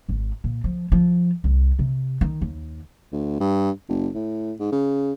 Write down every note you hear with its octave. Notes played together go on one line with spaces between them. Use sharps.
G#1
A#2
F3
F3
C2
C3
D#3
D#2
D2
G2
F#1
A2
G#2
C#3